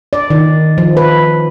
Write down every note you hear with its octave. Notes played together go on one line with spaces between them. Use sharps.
D5
D#3
F3
B4